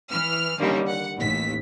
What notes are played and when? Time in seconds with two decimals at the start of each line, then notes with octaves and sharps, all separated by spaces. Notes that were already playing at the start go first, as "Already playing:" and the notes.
0.12 E3 F6
0.58 D3 D#3 G3 A#3 C#4
0.88 F#5
1.17 A1 D#2 B6